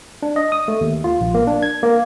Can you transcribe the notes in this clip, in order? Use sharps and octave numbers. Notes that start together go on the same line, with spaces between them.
D4
D#5
D#6
A3
D#2
F4
A#1
A#3
D4
G#6
A#3